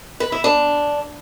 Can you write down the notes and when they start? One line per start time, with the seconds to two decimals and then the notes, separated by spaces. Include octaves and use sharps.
0.20 B4
0.32 E4
0.44 D4